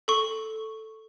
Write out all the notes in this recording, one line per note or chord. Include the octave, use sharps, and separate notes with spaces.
A4 C#6